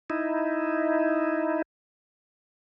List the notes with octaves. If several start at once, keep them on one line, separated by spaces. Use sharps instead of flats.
D#4 E4